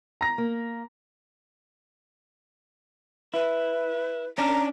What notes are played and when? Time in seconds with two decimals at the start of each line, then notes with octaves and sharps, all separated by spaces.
0.21 A#5 A#6
0.38 A#3
3.34 E4 B4
4.38 C#4 D4 A#5